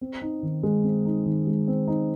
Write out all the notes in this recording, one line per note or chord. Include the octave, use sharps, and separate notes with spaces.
C4
D#4
D#3
G#3
C4
D#4
D#3
G#3
C4
D#4